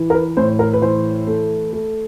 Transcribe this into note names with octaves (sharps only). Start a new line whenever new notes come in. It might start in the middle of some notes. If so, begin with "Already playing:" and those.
Already playing: E3
A#4
B4
A2 C5
A#4
B4
E3 C5
A3
A3